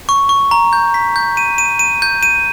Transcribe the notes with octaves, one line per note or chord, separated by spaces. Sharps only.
C#6
C#6
A#5
G6
B6
G6
D#7
D#7
D#7
G6
D#7